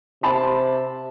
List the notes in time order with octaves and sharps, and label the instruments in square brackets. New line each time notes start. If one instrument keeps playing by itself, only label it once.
[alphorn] C3 [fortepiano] A5 B5 C6